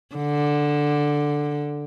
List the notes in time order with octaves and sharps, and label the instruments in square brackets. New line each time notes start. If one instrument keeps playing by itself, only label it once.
[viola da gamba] D3